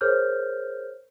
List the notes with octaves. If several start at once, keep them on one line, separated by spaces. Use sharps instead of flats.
G#4 A#4 C5 C#5 F6 G6